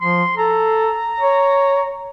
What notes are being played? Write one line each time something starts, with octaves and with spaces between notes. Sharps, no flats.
F3 C6
A4 A#5
C#5